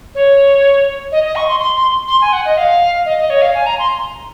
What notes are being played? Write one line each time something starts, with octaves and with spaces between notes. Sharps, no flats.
C#5
D#5
D#5
C#6
C6
C6
C6
C6
G#5
F#5
D#5
F5
D#5
D#5
C#5
F5
G#5
A#5
C6